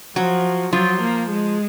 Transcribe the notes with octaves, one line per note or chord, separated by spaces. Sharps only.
F3 F#3 F#4
F3 F#3 F4
A#3
G#3